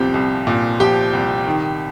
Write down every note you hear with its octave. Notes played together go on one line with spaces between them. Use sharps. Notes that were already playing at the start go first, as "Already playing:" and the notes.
Already playing: C2 A#2 F3 C4 G4
C2
A#2
F3 G4 G5
C2
D#3